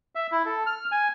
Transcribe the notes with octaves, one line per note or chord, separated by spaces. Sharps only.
E5
E4
A4
F6
G#5